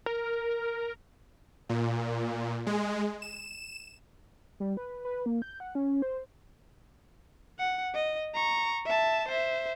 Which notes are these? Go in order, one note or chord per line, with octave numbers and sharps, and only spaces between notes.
A#4
A#2
G#3
E7
G3
B4
B4
A#3
G6
F#5
C#4
C5
F#5
D#5
A#5 C#6
E5 A5
C5 E5